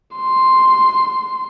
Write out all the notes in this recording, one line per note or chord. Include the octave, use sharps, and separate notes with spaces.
C6